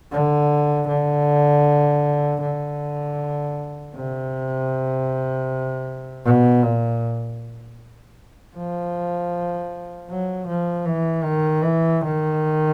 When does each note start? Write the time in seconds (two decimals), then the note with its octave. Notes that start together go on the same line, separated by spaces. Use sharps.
0.12 D3
0.88 D3
2.42 D3
3.95 C3
6.25 B2
6.63 A#2
8.56 F3
10.10 F#3
10.48 F3
10.86 E3
11.24 D#3
11.62 E3
12.01 D#3